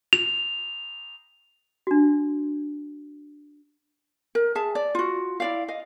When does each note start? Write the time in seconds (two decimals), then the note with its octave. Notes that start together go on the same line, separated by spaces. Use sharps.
0.13 F7
1.87 D4 F#4
4.35 A#4
4.55 G#4 E5 A5
4.75 D5
4.95 F4 F#4
5.40 E4 D5 F5
5.68 D#5 F5